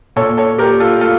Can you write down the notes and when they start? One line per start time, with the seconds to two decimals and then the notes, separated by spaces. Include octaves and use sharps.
0.16 A#2 A4 C#5
0.37 A4 C#5
0.58 A#2 G4 A#4
0.80 F4 A4
1.01 A3 F4 A4